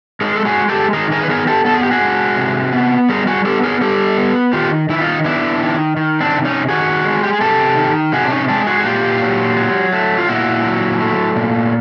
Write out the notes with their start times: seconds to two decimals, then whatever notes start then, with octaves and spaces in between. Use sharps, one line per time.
0.21 G#3 G#4 A#4
0.35 A4
0.45 F#4 G#4
0.57 G#3
0.69 G4 A4
0.93 D#3 G#4 A#4
1.11 G#4 A#4
1.23 B4
1.29 B3 G#4 A#4
1.47 G4 A4
1.65 B3 A4
1.74 G#4
1.83 G4
1.91 F#4 G#4
2.01 G#3
2.37 C3
2.73 B3
3.09 G3 G#4 A#4
3.27 F#4 G#4
3.45 B3 G4 A4
3.63 G#4 A#4
3.81 G3 G4 A4
4.18 B3
4.53 D#3 F4 G4
4.89 D#3 E4
5.01 D#4 F4
5.24 B3 D4 E4
5.61 D#3
5.97 D#3
6.20 C4 D4
6.33 C3
6.45 C#4 D#4
6.68 D#3 F#4 G#4
7.05 G#3
7.23 G4
7.33 G#4
7.41 C3 G4 A4
7.77 D#3
8.12 C3 F#4 G#4
8.25 D4
8.31 C#4 D#4
8.48 G#3 C4 D4
8.67 F#4 G#4
8.80 F#4
8.84 A#2 F4 G4
9.21 F#3
9.56 F#3
9.92 A3
10.18 F4
10.28 A#2 E4 F#4
10.64 F#3
11.00 A3
11.36 A#2